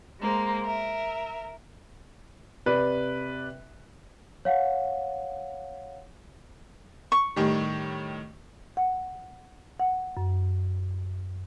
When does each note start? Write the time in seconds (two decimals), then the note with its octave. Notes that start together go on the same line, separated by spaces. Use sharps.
0.21 G#3 A#3 C5
0.64 A#4 E5
2.66 C3 B4 D5
4.45 C#5 F5 F#5
7.12 C#6
7.36 A2 D#3 G3
8.77 F#5
9.80 F#5
10.17 F#2